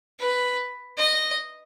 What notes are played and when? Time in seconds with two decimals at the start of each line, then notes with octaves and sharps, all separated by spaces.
0.20 B4
0.98 D#5